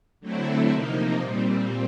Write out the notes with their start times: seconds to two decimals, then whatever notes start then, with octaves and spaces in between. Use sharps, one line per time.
0.20 D3 F#3 A3 C4 E4
0.69 C3 F3 A#3 D#4
1.18 A#2 G3 C4